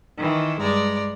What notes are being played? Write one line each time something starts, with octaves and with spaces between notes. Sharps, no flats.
D#3 E3 E4
G2 G#3 D5 A#5